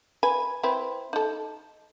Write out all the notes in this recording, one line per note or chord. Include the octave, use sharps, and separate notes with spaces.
B4 G#5
C4 E4 B4
D#4 A4